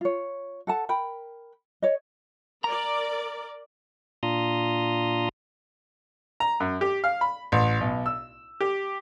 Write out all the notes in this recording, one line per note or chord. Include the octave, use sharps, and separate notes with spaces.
F4 C#5
A4 F#5 A5
A#4 G5 B5
C#5 D#5
A#4 D5 A#5
A#2 D4 F4 A#5 C6 D#6
A#5
F#2
G4
F5
B5
A1
B1
E6
G4